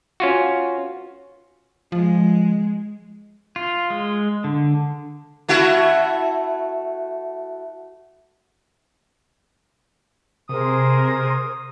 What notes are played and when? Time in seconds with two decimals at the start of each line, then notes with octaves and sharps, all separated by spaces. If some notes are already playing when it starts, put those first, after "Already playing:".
0.20 C#4 F4 F#4
1.92 F3 G#3
3.56 F4
3.90 G#3
4.44 D3
5.49 A3 E4 F#4
10.49 C3 G#4 A#4 C5 D#6